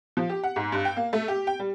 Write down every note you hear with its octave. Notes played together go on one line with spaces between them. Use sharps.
F3
G4
F#5
G#2
G2
G5
A#3
A3
G4
G5
G3